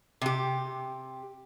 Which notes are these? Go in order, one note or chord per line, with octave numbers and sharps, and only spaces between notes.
C3 G4